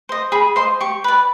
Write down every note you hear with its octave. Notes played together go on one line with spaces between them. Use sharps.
C5 D#5
G#4 B5
C5 D#5 C6
G4 C#6
B4 D5